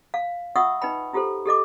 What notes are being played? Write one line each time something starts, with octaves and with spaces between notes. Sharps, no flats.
F5
F4 E5 F#5 C#6 D#6 E6
D#4 B4 D#5 G5 B5
E4 F4 G4 A4 C5
G4 A4 D#5 D6